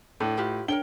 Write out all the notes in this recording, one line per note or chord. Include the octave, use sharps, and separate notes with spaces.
A2 D4 A4 B4
F4 G4 B4
D4 A#4 C#5 G5 D7 G7